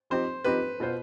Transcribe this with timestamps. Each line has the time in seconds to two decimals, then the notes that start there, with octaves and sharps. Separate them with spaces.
0.10 F3 C4 D#4 G4 C5
0.44 F3 C4 D#4 G4 B4
0.80 B2 B3 F4 C5